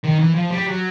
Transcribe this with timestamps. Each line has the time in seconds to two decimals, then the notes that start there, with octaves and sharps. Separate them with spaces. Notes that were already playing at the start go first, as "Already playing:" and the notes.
0.04 D#3
0.19 E3
0.34 F3
0.50 G3
0.66 F#3